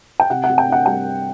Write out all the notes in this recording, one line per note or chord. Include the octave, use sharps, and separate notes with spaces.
G5
C3 F#5
F#5
C3
G5
D4 F#5
G3 G5